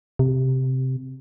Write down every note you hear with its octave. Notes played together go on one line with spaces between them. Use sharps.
C3